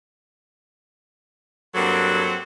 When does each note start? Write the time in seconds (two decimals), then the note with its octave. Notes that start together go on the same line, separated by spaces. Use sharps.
1.74 G2 F#3 A#3 C4 A4 F#5